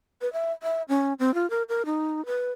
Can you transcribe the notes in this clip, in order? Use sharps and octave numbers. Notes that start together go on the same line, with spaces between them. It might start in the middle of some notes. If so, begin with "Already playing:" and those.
B4
E5
E5
C#4
C4
F4
A#4
A#4
D#4
B4